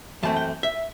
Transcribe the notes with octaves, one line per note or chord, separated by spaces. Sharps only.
F#2 E3 A3 C4 A5
G5
E5